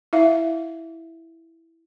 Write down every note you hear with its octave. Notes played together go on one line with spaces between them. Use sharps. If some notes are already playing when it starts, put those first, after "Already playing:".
E4 E5 F5